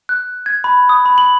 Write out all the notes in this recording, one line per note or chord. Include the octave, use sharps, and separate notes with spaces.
F#6
G#6
B5
D#6
B5
F#7